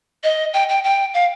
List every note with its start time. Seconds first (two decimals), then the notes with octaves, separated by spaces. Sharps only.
0.24 D#5
0.53 G5
0.69 G5
0.84 G5
1.14 F5